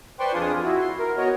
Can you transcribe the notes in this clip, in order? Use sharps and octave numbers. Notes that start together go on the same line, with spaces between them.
B4 C5 D5 G5 C6 C#6
F2 D4 F4 G#4 D#6
E4 F#4
C6
A#4
B3 F#4 C#5 D#5